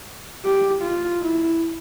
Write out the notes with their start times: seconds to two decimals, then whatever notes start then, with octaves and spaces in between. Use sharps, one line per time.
0.44 G4
0.82 F4
1.21 E4